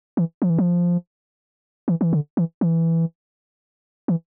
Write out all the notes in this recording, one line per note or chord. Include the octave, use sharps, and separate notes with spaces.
E3
F3
E3
F3
E3
E3
D3
E3
E3
E3